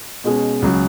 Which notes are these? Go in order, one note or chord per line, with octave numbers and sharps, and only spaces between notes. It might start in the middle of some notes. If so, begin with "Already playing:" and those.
B2 G#3 C#4 G#4
C#2 C#3 F#3